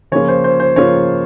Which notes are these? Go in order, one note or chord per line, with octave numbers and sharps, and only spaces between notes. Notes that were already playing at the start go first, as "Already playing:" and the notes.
C#3 F3 A#3 F4 C#5
C5
C5
C5
C#3 F3 A#3 F4 C#5